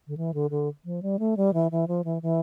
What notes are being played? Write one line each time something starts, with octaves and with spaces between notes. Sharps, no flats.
D3
E3
D3
D3
F3
G3
A3
G3
E3
E3
F3
E3
E3